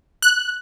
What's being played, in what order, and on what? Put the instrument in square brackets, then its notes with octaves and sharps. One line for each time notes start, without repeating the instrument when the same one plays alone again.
[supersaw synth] F#6